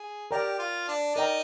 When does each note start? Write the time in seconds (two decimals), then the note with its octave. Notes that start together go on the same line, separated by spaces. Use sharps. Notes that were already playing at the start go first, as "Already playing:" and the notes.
Already playing: G#4
0.31 G4 A#4 D5 G5 A#5
0.59 F4
0.88 D4
1.15 D#4 A#4 D5 G5 A#5